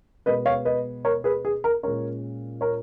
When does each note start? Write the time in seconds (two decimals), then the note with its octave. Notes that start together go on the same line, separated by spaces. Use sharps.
0.26 B2 G#3 B3 B4 D#5
0.46 C#5 F5
0.65 B4 D#5
1.05 A#4 C#5
1.24 G#4 B4
1.45 G#4
1.64 A#4
1.83 A#2 G#3 C#4 A#4 C#5
2.61 A#4 C#5